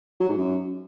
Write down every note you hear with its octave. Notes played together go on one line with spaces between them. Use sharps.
F#3
G#2
F#2